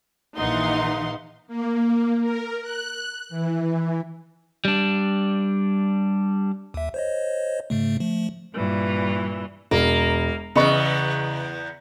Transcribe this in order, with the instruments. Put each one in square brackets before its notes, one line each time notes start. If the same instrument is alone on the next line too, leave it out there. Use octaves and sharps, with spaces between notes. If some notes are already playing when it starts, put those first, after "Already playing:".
[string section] A#1 E3 D#4 F5 F#5 C6
[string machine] A#3
A#4
F#6
E3
[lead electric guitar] G3 D4
[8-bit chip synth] D#2 E5
C5 C#5 D#5
G#2 C#3 A3
F3 A3
[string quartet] G2 A#2 E3
[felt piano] E1 [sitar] A#3
[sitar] E2 G#2 B3 [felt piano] C#3 D#5 C#6